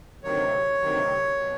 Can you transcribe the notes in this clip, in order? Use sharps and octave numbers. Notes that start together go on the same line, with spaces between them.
D2 C3 D#3 F#3 C#5
D2 C3 D#3 F#3
B2 F#3